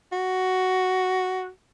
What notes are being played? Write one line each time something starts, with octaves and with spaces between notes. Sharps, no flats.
F#4